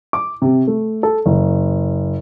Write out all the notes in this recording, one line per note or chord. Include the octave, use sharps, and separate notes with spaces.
D6
C3
A3
A4
F#1